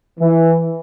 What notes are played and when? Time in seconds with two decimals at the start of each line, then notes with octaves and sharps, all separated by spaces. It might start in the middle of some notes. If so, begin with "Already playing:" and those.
0.20 E3